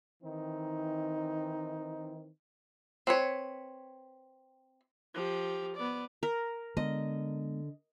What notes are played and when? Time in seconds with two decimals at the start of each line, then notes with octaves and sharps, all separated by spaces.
0.23 D#3 E3 C4 D#4
3.07 C4 B4 C#5
5.14 F3 G4
5.77 B3 D5
6.23 A#4
6.77 D3 G#3 B3 D#5